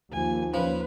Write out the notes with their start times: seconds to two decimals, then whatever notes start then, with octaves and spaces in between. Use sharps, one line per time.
0.13 D#2 F3 G#5
0.54 F3 C#4 B4